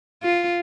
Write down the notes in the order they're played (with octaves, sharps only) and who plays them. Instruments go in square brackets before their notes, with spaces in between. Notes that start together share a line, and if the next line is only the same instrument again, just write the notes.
[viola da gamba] F4